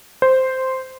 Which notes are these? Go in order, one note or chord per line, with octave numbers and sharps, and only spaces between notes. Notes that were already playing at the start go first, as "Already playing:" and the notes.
C5